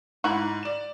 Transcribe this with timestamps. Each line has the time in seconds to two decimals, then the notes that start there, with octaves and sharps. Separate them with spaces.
0.24 G#2 E4 F#4
0.63 D5 E7